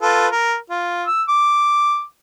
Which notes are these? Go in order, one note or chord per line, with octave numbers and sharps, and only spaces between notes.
F4 A4 B4
A#4
F4
E6
D6